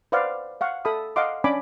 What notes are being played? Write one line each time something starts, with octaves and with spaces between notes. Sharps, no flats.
B4 C5 D5 F5 F#5
F5 F#5 C#6
A4 E5 B5 D#6
D#5 F5 F#5 C6 D6
C#4 D4 D5 G#5 B5 D6